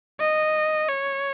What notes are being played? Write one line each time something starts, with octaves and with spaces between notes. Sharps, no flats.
D#5
C#5